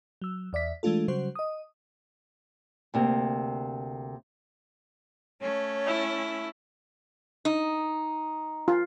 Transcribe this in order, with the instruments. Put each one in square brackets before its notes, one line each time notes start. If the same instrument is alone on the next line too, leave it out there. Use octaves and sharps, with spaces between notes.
[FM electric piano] F#3 E6
E2 D5 E5 B6
E3 G#3 A3 D4 F4 A4
C#3 F#3 G3 F#4 C5
D#5 D#6
[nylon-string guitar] D2 C3 A#3
[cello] A3 C#4 [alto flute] C#5
[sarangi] E4
[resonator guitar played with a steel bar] D#4
[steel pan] F4